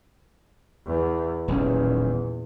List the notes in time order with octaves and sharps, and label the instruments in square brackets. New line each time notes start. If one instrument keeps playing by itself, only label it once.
[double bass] E2
[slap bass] D#1 B1 C#4 [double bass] E2 A#2